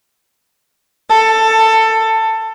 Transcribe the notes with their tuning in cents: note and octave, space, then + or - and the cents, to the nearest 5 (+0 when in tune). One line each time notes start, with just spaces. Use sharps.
A4 +15